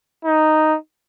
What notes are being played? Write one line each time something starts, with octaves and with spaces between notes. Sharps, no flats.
D#4